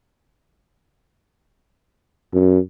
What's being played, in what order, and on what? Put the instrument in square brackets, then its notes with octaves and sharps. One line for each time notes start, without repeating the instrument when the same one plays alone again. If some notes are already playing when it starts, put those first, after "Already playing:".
[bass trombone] F#2